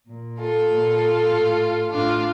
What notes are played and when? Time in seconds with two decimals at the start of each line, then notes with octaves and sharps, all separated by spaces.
0.09 A#2
0.40 F4 A4
0.70 A#2
1.31 A2
1.91 A2 D4 F4